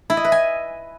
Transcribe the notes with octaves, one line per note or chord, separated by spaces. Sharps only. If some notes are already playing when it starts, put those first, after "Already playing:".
E4
D#5
B4
G#5